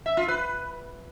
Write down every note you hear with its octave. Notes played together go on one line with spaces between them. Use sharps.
E5
F4
B4